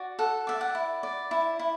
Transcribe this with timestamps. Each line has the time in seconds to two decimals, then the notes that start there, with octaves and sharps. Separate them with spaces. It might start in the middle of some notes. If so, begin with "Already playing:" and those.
Already playing: F#4 D5
0.19 A4 F#5
0.47 D5 E5
0.61 F#5
0.75 E4
1.03 D5
1.31 E4
1.59 E4